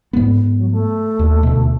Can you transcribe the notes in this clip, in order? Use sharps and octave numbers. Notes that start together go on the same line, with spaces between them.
G#2 B3
F#3
A3
D#2
D2 B2